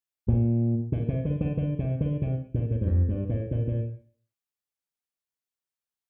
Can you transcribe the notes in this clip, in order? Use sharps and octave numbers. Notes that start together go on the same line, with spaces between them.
A#2
A#2
C3
D3
D3
D3
C3
D3
C3
A#2
A2
G2
F2
G2
A2
A#2
A#2